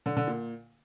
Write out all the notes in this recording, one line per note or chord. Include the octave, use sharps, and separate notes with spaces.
D3
D3
A#2